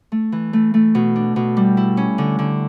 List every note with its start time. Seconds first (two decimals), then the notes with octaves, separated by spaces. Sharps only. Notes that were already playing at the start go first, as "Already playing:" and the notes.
0.12 A3
0.32 E3
0.53 A3
0.74 A3
0.95 B2
1.16 D4
1.36 B2
1.57 G3
1.77 E4
1.97 C#4
2.18 D3
2.39 D3